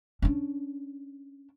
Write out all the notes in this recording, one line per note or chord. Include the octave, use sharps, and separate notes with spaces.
C#4 D4